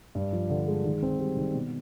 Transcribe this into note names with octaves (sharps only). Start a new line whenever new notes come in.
G2
F3
D3
G#3
D#3
C4
G3
D#3
B2